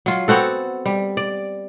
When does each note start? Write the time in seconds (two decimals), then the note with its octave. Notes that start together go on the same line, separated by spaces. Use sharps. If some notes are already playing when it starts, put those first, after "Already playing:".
0.06 F#3 F4
0.28 B3 C4 F#4 A4
0.86 G3
1.17 D5